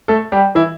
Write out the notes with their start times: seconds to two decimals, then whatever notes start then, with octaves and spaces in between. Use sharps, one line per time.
0.08 A3 A4
0.32 G3 G4
0.55 E3 E4